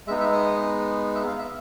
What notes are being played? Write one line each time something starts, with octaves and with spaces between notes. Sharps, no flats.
G#3 B3 D#4 E5
E5
D#5
E5
F5
E5